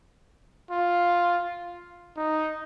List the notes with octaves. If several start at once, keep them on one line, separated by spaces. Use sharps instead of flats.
F4
D#4